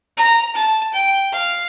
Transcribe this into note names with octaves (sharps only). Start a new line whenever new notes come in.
A#5
A5
G5
F5